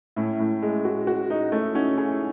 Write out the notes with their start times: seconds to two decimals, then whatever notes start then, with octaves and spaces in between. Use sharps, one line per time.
0.16 A2 C#4 E4
0.39 A2
0.62 G#3
0.85 F#4
1.07 F#4
1.30 D#4
1.52 A3 C#4 E4
1.75 C#4 D#4 F#4
1.97 C#4 E4 G#4